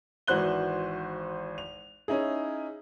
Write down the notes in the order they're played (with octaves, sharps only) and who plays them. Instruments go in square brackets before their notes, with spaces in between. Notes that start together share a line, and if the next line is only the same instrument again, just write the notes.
[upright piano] G#1 E3 F#4 C5 F#6 G7
F7
C#4 D#4 E4 G#4